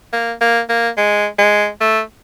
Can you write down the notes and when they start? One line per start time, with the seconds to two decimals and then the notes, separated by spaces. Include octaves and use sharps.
0.13 A#3
0.41 A#3
0.69 A#3
0.97 G#3
1.38 G#3
1.81 A3